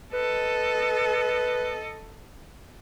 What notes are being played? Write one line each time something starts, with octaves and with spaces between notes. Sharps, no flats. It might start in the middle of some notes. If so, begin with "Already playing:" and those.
A4 B4 D#5